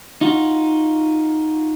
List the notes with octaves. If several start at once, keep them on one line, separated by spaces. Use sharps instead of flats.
D#4 F4 F#4